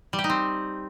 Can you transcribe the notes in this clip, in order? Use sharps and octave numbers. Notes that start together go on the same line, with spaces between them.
G3
G4
D#4
C4